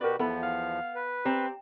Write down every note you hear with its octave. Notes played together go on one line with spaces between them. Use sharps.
B2 F#4 G4 A#4 B4 D5
E2 F3 B3 E4 A4 B5
F5
B4
C4 G4 A#5